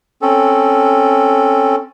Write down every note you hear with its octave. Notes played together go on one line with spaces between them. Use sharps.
C4 C#4 A4